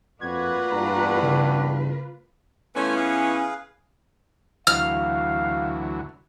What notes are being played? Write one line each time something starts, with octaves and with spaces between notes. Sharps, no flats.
F2 A#3 F4 F#4 B4 D5 F#5 G#6
E2 G2 A#5
C#3
E3 A3 B3 C#4 F4 G#5
G#4 B4 F5
D2 E3 F#3 F5 F6